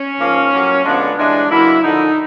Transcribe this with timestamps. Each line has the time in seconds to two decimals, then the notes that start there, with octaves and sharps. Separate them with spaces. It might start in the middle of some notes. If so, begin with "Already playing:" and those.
Already playing: C#4
0.19 G#2 F3 A#3
0.51 A2 F#3 A#3
0.84 D3 F3 G#3 B3 D4
1.17 G2 E3 G#3 D4
1.50 C#3 F#3 A#3 E4
1.83 F#2 D3 F3 D#4